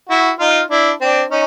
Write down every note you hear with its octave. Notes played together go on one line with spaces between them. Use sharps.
E4 F#4
D#4 F4
D4 E4
C4 D4
C#4 D#4